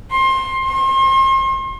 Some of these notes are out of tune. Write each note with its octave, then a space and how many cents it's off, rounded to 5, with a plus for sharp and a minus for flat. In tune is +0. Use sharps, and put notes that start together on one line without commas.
C6 +25
C6 +40